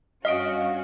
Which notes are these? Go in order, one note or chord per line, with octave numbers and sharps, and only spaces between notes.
G2 C#4 F#4 D#5 F5 D#6 D7